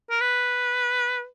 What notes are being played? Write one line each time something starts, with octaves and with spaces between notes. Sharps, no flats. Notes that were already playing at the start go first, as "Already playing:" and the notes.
A#4
B4